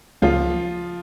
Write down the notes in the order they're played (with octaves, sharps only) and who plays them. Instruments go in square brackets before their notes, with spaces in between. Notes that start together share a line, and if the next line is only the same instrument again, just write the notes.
[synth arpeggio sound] C#2 C#3 F#3 A#3 [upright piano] F3 F4